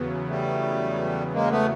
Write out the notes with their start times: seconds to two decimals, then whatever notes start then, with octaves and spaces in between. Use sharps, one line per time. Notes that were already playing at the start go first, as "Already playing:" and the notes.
Already playing: E2 C#3 F#3 B3
0.28 G3 A3
1.33 G#3 A#3
1.50 A3 B3